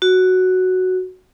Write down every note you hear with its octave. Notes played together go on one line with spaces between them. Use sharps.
F#4